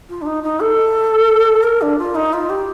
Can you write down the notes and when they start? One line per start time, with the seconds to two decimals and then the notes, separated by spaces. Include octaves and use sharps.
0.09 F4
0.21 D4
0.26 D#4
0.43 D#4
0.60 A4
1.63 A#4
1.81 D4
1.98 F4
2.15 D#4
2.33 F4
2.49 G4